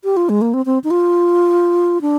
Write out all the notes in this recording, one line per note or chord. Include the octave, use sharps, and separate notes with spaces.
G4
F4
G#3
A#3
C4
C4
D#4
F4
D4